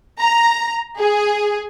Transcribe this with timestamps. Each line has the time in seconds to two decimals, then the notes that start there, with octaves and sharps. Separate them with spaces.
0.20 A#5
0.99 G#4